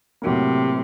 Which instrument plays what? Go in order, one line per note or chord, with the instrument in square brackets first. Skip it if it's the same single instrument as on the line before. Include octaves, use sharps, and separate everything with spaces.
[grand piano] A2 F#3 A#3 [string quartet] C3